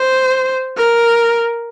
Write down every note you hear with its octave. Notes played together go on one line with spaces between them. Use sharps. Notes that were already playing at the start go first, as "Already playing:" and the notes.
Already playing: C5
A#4